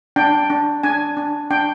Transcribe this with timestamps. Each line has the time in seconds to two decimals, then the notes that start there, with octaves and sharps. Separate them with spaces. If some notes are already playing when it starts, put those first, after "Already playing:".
0.16 D4 G5
0.50 D4
0.83 D4 G#5
1.17 D4
1.51 D4 G5